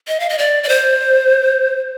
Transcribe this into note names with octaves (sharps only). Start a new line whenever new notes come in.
D#5
F5
D#5
D5
D5
C5